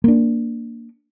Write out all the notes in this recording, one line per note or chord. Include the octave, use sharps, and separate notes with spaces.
A#3 D4